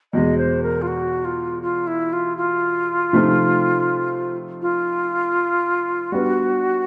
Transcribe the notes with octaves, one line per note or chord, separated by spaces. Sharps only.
E2 B2 G#3 D#5
C5
A#4
F4
F#4
F4
F4
E4
F4
F4
C3 F3 A3 C4 D#4
F4
G3 B3 D4 F#4